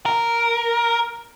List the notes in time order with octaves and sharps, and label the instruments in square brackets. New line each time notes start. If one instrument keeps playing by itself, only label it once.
[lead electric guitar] A#4